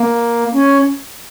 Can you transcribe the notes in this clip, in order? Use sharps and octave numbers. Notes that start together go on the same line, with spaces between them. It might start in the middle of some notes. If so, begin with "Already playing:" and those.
Already playing: A#3
C#4